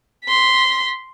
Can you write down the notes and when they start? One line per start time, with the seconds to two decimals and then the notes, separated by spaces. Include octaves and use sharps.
0.25 C6 B6